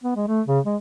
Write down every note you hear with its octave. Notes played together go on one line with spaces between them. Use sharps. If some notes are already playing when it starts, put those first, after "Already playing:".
B3
G#3
A3
C#3
G#3